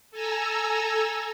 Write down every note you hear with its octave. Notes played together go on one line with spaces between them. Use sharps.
A4 G#5 A#5 E6